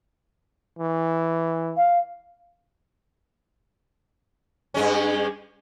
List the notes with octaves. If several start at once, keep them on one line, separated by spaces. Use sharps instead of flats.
E3
F5
G2 G#3 C#4